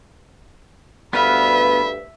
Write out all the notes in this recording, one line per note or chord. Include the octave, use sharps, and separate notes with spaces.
D2 G2 B3 B4 E5 F5 B5